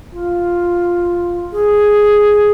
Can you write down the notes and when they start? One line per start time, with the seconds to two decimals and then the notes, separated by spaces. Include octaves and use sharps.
0.13 F4
1.52 G#4